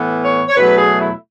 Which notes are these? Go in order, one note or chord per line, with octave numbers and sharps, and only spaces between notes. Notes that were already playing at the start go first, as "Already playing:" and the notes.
Already playing: A2 E3 B3
C#5
C#5
E2 B2 F#3 A3 B4
G#4
E4